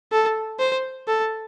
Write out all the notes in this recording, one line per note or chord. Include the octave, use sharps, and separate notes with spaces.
A4
C5
A4